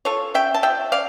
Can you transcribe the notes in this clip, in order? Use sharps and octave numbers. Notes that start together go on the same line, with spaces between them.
F4 A4 C#5
C#4 E5 G5
A5
F3 E5 G5
C#4 D5 F5